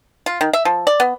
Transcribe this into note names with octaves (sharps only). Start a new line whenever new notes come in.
F4
D#3
E5
F3
D5
B3